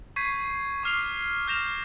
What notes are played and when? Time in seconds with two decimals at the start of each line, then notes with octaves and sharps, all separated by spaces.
0.16 C#6 G6 G#6 B6 C7 D#7
0.83 C#6 D6 F6 C7 F7 G7
1.47 F6 G6 A#6 E7 F7